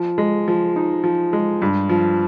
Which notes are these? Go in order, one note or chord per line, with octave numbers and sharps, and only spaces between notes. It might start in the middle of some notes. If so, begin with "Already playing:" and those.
Already playing: F3
G#3
F3
D#4
F3
G#3
G2
F3